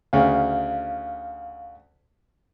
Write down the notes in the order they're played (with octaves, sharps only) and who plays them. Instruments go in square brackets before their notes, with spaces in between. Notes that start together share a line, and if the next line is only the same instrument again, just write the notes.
[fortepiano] D2 C#3 [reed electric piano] F5